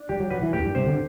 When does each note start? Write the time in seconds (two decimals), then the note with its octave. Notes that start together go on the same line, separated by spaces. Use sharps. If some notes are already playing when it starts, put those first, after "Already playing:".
Already playing: D4
0.09 G3 G4
0.20 F#3
0.30 F#3 B4
0.42 E3
0.53 A2 G4
0.59 F#2
0.64 G2
0.75 C3 C5
0.86 D3